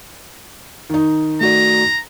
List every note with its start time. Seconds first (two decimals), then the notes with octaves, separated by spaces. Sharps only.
0.90 D#3 D#4
1.41 A3 F#4 D5 A#5